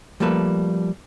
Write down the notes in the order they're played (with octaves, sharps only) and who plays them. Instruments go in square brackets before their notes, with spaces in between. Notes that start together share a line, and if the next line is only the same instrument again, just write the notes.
[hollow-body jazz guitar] F3 G3 A3 A#3 A4 B4